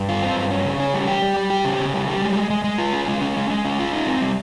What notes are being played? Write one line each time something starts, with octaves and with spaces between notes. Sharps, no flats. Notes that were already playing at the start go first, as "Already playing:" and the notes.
Already playing: G2
F4
C4
G2
C#4
C#3
C#4
G3
G4
G3
G3
G4
C#3
C#3
G3
G3
G#3
G#3
G#3
G#3
F4
C#4
G#3
C#4
G#3
G#3
C#4
F4
D#4
C4
G3